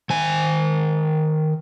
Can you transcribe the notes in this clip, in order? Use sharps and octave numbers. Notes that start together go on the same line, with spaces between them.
D#3 G#5